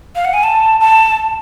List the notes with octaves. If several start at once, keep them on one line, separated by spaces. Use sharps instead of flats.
F5
F#5
G#5
A5
A5